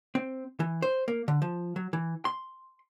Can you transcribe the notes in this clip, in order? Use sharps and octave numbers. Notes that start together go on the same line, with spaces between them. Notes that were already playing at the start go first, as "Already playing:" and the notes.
C4
E3
C5
A#3
D3
F3
F#3
E3
C6